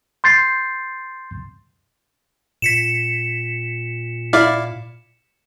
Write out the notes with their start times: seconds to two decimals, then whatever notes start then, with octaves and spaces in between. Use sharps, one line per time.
0.24 C6 G6 A6 C7
2.62 A#2 B6 C#7 E7
4.33 E4 D5 F5